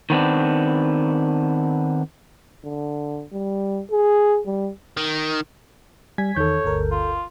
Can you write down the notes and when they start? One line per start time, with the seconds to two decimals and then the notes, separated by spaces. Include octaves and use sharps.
0.10 D#3 B3 C4 D4
2.64 D3
3.33 G3
3.91 G#4
4.46 G3
4.97 D#3
6.18 G3 G#5 G#6 B6
6.37 E2 D#3 A4 C#5 G6
6.65 G1 D2 A#4
6.91 F4